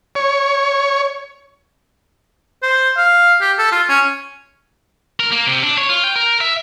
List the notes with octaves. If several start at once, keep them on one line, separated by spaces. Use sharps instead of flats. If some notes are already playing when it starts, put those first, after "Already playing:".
C#5
C5
F5
G4
A4
F4
C#4
A#4
A#3
C3
D4
C#5
F4
G5
A#4
E5